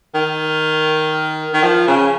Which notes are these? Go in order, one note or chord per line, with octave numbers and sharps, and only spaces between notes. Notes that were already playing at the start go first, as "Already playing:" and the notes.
D#3
D#3
F3
C#3